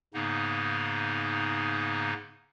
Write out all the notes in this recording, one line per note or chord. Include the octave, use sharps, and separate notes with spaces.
G#2 C#3 A#3 B3 D#4